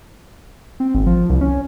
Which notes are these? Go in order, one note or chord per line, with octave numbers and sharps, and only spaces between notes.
C4
G#1
F3
C2
C#4